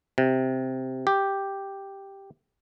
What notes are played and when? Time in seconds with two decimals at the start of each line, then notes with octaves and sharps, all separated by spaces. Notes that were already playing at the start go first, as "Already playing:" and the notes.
0.18 C3
1.07 G4